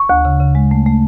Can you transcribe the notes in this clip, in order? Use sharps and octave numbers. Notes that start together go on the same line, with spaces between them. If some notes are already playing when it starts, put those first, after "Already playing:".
Already playing: C#6
D2
C#3
C#3
G#3
A3
A3